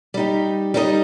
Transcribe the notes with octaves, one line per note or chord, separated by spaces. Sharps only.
G3 D#4 G4
G3 D#4 A#4 D#5